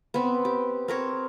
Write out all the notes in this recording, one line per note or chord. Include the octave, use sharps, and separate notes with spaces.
B3 C4
G4
C4 A#4 C#5